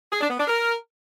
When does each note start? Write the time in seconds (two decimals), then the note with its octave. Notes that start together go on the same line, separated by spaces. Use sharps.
0.12 G#4
0.21 D4
0.30 B3
0.39 D4
0.48 A#4